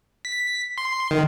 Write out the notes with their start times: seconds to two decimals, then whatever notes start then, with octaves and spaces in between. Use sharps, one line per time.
0.25 B6
0.78 C6
1.11 D#3